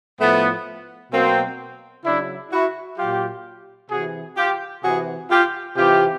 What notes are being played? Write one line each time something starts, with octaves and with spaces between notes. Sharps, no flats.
A2 F3 A3 B3
B2 F#3 A#3 C4
C#3 F#3 D4 E4
E4 F#4
A#2 F#3 F4 G4
C3 E3 F#4 G#4
F4 G4
C3 E3 F#4 G#4
F4 G4
C3 E3 F4 G4